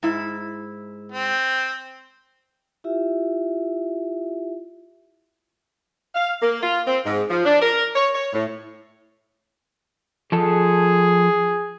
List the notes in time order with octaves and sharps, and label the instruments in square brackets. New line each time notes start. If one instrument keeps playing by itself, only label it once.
[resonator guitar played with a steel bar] G#2 E4
[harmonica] C4
[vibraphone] E4 F4 G4 E5
[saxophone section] F5
A#3
F4
C4
G#2
F3
D4
A#4
C#5
C#5
A2
[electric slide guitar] F3 A4 [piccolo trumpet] G#4